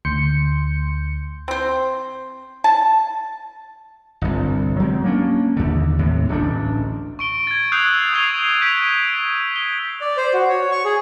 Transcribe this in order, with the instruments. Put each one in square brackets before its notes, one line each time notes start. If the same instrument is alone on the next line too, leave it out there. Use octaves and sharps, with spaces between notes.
[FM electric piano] D2 C6 G6 C#7
[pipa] C4 C5
A5
[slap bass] G1 C2
F#3 G#3 C4
A#3 C#4 D4
D#2 D3
D#2 A2 C3
D1 A1 D4
[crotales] C#6 D7 G7
G#6 A6
D#6 E6 F#6 G6 C7 F7
C#6 G#6 C7 D#7 F7 G7
G6 B6 D7 F7
G7
[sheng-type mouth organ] D5
C5
F#4
C#5
C#6
G#4